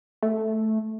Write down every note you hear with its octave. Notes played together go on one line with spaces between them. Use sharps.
A3